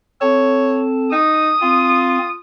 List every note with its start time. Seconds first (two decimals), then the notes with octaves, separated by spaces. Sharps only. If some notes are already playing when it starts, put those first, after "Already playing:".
0.21 C4 A4 C#5 A5
1.12 D#4 D#6
1.62 C4 F4